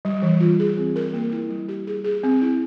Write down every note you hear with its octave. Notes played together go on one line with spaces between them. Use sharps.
G3
E3
F4
G#4
C4
A#4
A#3
E4
G3
G4
G#4
G#4
C4
E4